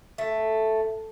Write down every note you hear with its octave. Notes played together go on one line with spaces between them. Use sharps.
A3